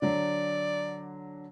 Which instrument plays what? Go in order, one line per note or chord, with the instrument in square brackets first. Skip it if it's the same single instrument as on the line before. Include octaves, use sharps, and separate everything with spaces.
[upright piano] D3 F#3 [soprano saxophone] D5